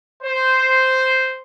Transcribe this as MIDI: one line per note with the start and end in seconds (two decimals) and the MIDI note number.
0.23 1.41 72